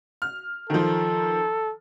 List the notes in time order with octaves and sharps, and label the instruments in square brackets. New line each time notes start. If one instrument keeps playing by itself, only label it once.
[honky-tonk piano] F6
[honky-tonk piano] D#3 F3 [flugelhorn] A4